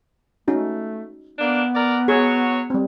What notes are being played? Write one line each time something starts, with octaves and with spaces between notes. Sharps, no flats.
A3 C#4 D#4 F#4
A#3 B3 D4
A#4 D5
F#3 G#4 C#5
G3 C4